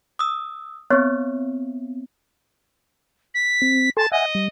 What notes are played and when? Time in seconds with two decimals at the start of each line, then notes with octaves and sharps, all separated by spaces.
0.19 D#6 E6
0.90 B3 C4 C#5
3.34 B6
3.62 C4
3.97 A4 G#5 A5 C6
4.12 D#5 E5 F#5 G#5
4.35 G3